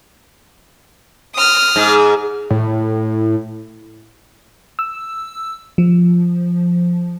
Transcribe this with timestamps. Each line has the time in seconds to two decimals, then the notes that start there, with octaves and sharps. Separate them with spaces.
1.35 D#6 F6
1.76 G#2
2.51 A2
4.79 E6
5.78 F3